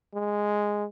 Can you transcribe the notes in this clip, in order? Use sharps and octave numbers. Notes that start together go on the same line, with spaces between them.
G#3